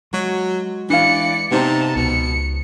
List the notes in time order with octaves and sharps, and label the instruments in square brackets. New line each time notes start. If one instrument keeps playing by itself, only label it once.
[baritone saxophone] F#3 [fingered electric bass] G#3 [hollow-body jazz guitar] F#4
[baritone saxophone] E3 [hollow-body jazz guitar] D4 F5 [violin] D5 C#7
[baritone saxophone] C3 [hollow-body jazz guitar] B3 D#4 C5 [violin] A5 A#5
[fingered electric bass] C#2 [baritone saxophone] B2 [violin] C#7